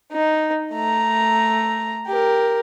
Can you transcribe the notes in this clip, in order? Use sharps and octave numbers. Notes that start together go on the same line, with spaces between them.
D#4
A3 A#5
G4 A#4